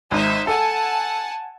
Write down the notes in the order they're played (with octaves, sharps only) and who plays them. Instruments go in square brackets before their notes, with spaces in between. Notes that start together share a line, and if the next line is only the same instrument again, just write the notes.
[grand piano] G#1 [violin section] D#4 C5 E5
[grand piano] A4 [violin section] F#5 G#5 A5